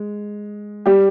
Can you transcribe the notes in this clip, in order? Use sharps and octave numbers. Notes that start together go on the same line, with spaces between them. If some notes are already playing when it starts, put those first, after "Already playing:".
Already playing: G#3
G3 G4